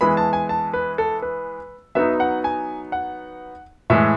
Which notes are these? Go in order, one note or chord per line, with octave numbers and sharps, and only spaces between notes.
E3 G#3 B3 B5
A5
G#5
A5
B4
A4
B4
F#3 B3 D#4 E5
F#5
G#5
F#5
A2 E3 G#3 E5